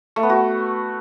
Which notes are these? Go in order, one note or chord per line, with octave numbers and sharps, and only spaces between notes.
A3
B3
F#4